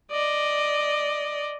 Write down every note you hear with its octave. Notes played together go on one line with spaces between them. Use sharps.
D5 D#5